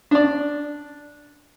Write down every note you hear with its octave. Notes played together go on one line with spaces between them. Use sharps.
D4 D5